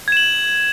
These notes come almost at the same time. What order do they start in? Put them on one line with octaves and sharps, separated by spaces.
G#6 E7 F#7